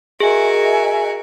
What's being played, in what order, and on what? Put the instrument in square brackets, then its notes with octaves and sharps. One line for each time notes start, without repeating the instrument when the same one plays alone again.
[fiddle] F#4 A#4 [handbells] G#4 [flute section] D#5 E5 G#5